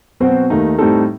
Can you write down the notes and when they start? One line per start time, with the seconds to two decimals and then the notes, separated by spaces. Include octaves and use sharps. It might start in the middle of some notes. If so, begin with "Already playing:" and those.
0.20 B2 F#3 C4 F#4 C5
0.50 D#2 D#3 A3 D#4
0.78 A2 G3 C4 D#4 A4